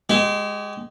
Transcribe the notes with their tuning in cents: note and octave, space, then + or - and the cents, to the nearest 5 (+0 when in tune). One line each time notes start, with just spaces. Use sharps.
G#3 -5 G4 -35